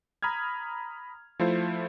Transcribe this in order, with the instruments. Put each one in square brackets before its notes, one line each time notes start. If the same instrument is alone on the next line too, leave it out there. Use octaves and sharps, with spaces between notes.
[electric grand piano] A#5 B5 D#6 F6 G#6
F3 A3 E4 F4 C5